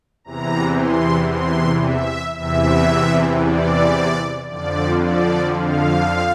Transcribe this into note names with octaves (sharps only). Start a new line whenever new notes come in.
E2 C3 E3 A#5
C6
C6
E5
E2 C3 E3 E5
D5
F2 D3 F3 D5
D5
F5